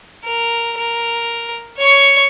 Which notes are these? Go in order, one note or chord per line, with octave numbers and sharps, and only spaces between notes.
A#4
A#4
C#5 C#6